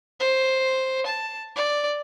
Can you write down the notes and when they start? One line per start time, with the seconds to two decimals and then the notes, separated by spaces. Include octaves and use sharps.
0.20 C5
1.06 A5
1.56 D5